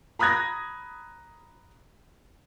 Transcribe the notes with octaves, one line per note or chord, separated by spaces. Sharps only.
A#5 B5 D#6 F#6 G#6 A#6